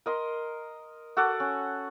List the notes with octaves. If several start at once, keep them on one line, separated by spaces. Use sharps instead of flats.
A#4 D#5 C6
F#4 A4 F#5 D6
C#4